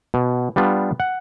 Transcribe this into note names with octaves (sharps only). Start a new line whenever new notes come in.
B2
G3 B3 D4 F4
F#5